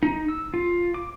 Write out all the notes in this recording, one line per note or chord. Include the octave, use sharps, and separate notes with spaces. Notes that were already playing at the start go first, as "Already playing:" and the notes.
D#4
E6
F4
D6